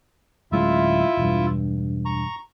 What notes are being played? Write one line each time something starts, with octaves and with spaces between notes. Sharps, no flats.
D1 G#3 C#4 E4 F4 E5
E1 G2
A#5 C#6